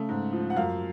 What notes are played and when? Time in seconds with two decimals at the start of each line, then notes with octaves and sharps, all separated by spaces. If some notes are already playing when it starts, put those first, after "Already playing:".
Already playing: C#3 A3
0.09 G#2
0.33 F3
0.50 F#5
0.56 F#2 F5